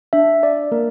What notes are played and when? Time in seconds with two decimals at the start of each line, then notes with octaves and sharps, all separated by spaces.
0.13 D4 E5
0.43 D4 D5
0.72 A#3 A#4